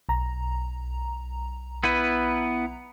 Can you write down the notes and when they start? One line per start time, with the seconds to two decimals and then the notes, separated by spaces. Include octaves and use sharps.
0.09 B1 A#5
1.84 B3 E4 B4